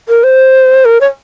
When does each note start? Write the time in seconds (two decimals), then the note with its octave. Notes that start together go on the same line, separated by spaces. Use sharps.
0.09 A#4
0.24 C5
0.85 A#4
1.01 C#5